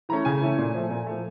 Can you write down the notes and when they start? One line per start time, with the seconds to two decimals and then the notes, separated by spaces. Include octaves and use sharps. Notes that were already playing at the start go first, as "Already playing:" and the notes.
0.09 E3 A3 C#4 A#5
0.25 C#3 G#5
0.41 E3 A3 C#4
0.58 A#2
0.74 F3 A3
0.90 A#2
1.06 F3 A3